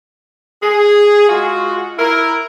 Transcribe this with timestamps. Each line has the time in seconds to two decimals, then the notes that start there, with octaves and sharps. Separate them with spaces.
0.62 G#4
1.29 G#3 F4 F#4
1.98 E4 A#4